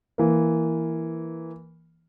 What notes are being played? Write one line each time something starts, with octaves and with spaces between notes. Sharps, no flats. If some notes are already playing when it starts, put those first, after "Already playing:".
E3 A#3